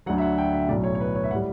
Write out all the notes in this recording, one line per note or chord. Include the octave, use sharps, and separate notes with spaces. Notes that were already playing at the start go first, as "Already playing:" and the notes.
D2 D3 F#3 F#5
E5
F#5
G5
E5
B1 A2 F#3 D5
C#5
C#5
B4
C#5
E5
A2 G3 F#5